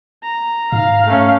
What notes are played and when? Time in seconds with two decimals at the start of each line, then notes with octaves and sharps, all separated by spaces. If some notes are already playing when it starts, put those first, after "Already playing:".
0.23 A#5
0.72 G#2 F5
1.06 A3 C#4